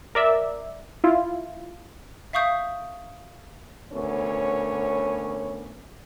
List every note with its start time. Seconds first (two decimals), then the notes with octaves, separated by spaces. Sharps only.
0.15 A#4 D5 E5
1.04 E4 F4
2.33 E5 F5 C#6 D#6 G6
3.93 D2 B3 C#4 A#4 C#5